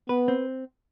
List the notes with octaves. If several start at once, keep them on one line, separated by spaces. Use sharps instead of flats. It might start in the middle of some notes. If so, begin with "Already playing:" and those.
B3 B4
C4